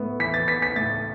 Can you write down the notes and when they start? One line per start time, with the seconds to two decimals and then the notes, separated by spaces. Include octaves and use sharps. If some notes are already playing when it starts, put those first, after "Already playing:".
Already playing: A2 B3
0.20 E3 B6
0.34 A6
0.47 B3 B6
0.62 B6
0.76 A2 A6